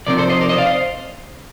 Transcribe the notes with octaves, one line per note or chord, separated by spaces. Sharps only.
C3 F3 C4 D#4 A#4 D5
A4 C5
C5 D#5
A#4 D5
C5 D#5
D5 F5
C5 D#5